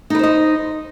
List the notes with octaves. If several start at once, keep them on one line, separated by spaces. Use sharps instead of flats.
D#4 B4 C5 D#5